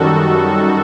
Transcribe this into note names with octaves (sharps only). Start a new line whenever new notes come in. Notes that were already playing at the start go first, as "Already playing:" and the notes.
Already playing: F#2 D#3 G3 F#4 A4